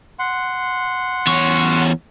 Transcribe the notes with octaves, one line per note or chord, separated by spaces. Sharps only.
F#5 C6
E2 C#5